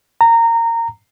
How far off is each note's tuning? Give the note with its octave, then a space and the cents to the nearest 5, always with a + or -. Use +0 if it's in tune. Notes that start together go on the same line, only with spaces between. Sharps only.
A#5 -20